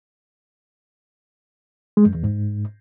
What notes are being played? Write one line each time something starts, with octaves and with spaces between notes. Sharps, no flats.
G#3
F#2
E2
G#2